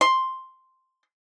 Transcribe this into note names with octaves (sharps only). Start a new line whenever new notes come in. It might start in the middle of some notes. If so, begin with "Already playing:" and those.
C6